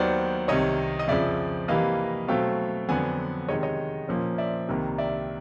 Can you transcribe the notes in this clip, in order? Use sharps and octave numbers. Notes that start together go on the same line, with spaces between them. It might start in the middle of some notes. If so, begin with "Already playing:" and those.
Already playing: D#2 D#3 F#3 B3 C5 D5
C2 C3 D#3 C#5 D#5
D#5
F2 C#3 F3 D5 E5
C3 E3 G3 A#3 D#5 F5
B2 F#3 A3 C4 F5 G5
F2 D3 F#3 B3 D4 F#5 G#5
C3 D#3 G#3 C#5 D#5
C#5 D#5
A#2 F3 A#3 C#4
D5 E5
C2 C3 D#3 G3 A#3
D5 E5